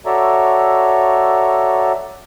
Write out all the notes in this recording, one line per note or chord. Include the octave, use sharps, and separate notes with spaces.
F#4 A4 C#5 D5 E5 A#5